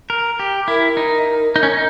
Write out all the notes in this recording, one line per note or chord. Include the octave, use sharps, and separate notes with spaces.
A#4
G4
E4 A#4
D#4
D#4
C#4
D#4